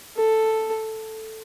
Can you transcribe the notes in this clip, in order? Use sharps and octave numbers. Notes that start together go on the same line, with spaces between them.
A4